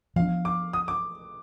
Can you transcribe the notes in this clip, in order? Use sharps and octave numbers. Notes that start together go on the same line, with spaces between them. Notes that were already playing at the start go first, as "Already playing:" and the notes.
F3 B3 D4 F5
D6
D#6
D6